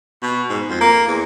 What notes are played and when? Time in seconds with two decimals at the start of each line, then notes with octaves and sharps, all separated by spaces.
0.23 B2
0.50 G#2
0.68 F2
0.81 A#3
1.08 E2